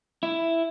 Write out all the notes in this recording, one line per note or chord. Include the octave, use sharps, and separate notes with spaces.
E4